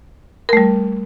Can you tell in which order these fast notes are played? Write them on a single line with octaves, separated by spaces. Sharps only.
A#4 A3 G3